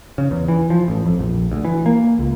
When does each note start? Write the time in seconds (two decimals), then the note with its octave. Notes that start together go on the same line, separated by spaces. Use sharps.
0.18 C#3
0.31 E2
0.48 E3
0.70 F3
0.88 A1
1.06 F2
1.19 A#1
1.52 D2
1.65 E3
1.86 A#3
2.19 C#2